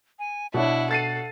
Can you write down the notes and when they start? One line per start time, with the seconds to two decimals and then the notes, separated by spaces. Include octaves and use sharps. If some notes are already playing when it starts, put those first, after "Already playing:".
0.19 G#5
0.54 B2 D4 E4 C#5 F#5
0.91 A4 A6 C7 D#7